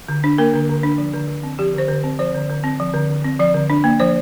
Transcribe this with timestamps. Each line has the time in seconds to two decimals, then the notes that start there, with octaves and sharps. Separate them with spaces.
0.08 D3
0.24 D4
0.38 A#3 A#4
0.53 D3
0.69 D3
0.83 D4
0.98 F3
1.13 D3
1.28 D3
1.43 C4
1.59 F3 G4
1.75 D3 C5
1.88 D3
2.04 C4
2.19 F3 C5
2.34 D3
2.49 D3
2.64 C4
2.80 F3
2.94 D3
3.09 D3
3.25 C4
3.39 F3 D5
3.54 D3
3.70 D4
3.84 A#3
4.00 F3 C5